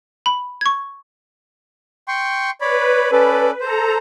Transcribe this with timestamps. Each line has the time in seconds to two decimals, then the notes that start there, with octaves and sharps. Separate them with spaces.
0.26 B5
0.61 C#6 G#6
2.08 G5 C6 C#6
2.61 B4 C#5 D5 B5
3.12 C#4 A4 D5
3.61 A4 C5 A#5